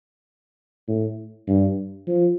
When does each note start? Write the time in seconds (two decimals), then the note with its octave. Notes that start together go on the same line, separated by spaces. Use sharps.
0.88 A2
1.48 G2
2.07 F3